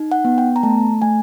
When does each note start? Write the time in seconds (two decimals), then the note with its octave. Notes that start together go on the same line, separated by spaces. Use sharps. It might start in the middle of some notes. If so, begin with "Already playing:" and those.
Already playing: D#4
0.12 F#5
0.25 B3
0.38 G5
0.56 A#5
0.63 A3 A5
1.02 A3 G#5